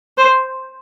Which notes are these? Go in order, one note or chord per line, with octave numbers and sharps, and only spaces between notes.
C5